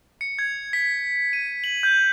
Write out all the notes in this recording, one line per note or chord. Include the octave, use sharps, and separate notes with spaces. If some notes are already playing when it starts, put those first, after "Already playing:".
C#7
G#6
B6
D#7
F#7
G6